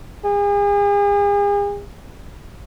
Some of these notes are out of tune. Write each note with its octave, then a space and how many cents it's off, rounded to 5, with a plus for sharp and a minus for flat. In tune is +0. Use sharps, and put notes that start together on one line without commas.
G#4 -40